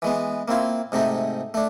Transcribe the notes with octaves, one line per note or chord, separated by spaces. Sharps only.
E3 G#3 B3
A#3 C4 E4 F4
G#2 C3 A3 D#4
A3 D4